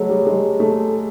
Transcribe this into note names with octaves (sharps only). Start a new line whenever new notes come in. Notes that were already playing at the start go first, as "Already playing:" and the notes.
Already playing: F#3 G#3 A3
G3
G#3
A3